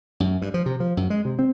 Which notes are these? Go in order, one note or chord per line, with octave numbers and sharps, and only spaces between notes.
F#2
G2
F3
C3
F3
F#2
G#3
C3
C4